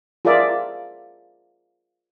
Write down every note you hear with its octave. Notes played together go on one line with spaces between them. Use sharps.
F4 G#4 A#4 D5 E5